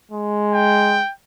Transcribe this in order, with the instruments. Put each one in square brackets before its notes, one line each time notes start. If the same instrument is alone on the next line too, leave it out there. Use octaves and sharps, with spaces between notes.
[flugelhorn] G#3
[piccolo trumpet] G5